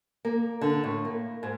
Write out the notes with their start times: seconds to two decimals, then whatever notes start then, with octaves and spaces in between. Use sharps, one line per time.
0.25 A#3
0.61 D3
0.84 A2
1.05 A#3
1.43 G#2